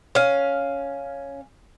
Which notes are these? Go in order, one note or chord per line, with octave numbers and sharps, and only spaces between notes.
C#4 F5